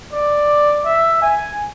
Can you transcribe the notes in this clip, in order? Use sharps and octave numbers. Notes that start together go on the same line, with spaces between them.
D5
E5
G#5